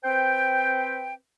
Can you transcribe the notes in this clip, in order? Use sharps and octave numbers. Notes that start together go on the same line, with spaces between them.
C4 B4 C5 G5